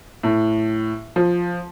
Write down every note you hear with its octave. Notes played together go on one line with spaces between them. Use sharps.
A2
F3